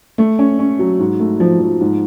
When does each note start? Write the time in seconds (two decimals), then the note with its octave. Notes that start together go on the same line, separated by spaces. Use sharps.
0.18 A3
0.39 C#4
0.59 C#4
0.79 F#3
0.99 G#2
1.20 A3
1.40 F3
1.60 F3
1.81 G#2